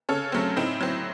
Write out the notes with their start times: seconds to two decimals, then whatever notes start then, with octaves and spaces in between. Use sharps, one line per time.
0.09 C#3 A4 C#5
0.32 F#3 A3 C4
0.56 A2 C4 D#4
0.81 F#3 C4